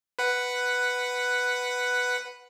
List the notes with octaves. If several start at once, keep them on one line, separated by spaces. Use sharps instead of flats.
B4 F#5